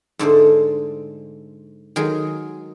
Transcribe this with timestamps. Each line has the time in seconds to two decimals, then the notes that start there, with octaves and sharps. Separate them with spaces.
0.19 G#2 D3 A3 C5
1.96 D#3 F#3 G#3 G#4